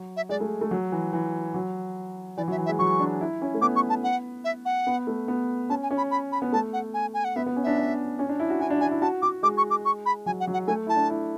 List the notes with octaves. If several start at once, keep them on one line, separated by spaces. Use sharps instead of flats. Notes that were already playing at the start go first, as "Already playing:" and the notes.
Already playing: F#3
E5
G#3 D5
A3
A3
F#3
E3
E3
F#3
E3 D5
F#3
E5
E3
E5
G#3
F#3 C#6
D4
E4
C#4
A3
B3 D6
C#6
A5
F#5
E5
F#5
B3
A3
B3
C#4 A5
G#5
C#4
B5
B5
B5
B3
A3 A5
F#5
G#5
G#5
F#5
B3 E5
B3
C#4
D4 E5
D4
C#4
D4
E4
F#4
E4 G#5
D4
D4 G#5
E4
F#4 A5
F#4 D6
G#3 D6
C#6
D6
C#6
B5
F#3 G#5
F#5
F#3
F#5
A3 G#5
E4 A5
D4
E4